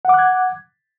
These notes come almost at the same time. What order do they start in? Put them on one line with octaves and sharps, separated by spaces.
F#5 D6 F#6 G#6